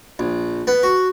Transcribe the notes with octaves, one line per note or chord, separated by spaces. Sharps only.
A#1
B3
F#4